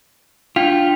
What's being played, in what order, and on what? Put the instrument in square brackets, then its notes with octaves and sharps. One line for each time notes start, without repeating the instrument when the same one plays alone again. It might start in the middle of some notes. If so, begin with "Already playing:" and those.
[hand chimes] D4 G5 B6 [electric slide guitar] F4